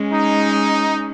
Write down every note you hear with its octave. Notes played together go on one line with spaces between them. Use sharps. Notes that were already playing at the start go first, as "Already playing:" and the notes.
Already playing: G#3 C#4
D#4